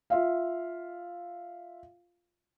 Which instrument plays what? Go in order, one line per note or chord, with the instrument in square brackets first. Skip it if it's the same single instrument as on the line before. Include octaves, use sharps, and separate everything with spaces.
[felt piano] F4 E5 F5